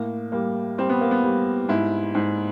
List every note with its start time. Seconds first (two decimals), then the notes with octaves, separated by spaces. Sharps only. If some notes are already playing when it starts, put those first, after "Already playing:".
Already playing: A2 A#3
0.32 G3 A#3
0.78 G3 C4
0.89 B3
1.01 A#3
1.11 B3
1.23 G3
1.69 G#2 E4
2.15 G#2